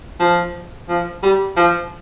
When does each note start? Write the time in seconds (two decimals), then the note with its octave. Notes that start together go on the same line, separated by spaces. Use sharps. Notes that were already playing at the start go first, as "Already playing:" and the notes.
0.20 F3
0.89 F3
1.23 G3
1.57 F3